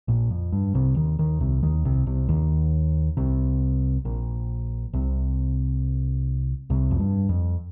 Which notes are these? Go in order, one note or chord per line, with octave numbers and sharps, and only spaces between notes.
A#1 A#2
F2
G2
C2 C3
D#2 D#3
D#2 D#3
C2 C3
D#2 D#3
C2 C3
C2 C3
D#2 D#3
C2 C3
A#1 A#2
C2 C3
C2 C3
F2
G2
F2